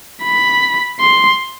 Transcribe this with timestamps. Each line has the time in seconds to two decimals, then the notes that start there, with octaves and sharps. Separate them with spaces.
0.23 B5
1.00 C6